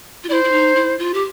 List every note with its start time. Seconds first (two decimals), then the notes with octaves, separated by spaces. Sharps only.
0.24 F4
0.29 E4 C5 D5
0.44 E4
0.52 D#4
0.76 E4
0.99 F4
1.14 G4